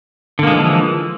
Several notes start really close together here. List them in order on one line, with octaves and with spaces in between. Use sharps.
D3 A#3 G#3 F3 E3